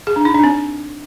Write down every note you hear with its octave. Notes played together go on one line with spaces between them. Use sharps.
G#4
D4
D#4
D4
C4